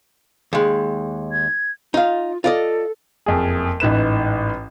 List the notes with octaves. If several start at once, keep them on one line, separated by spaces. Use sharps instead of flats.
D#2 G#3
G#6
D#4 F4 F5
F4 A4 D5 D#5
F#1 F2 G#4
A1 G#2 B4 E7